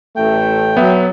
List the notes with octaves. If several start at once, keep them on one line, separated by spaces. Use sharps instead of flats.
A1 A3 G5
F#3 B3 E5